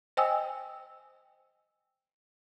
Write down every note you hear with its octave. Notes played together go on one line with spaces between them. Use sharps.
C5 D#5 G5 G#5 D#6 E6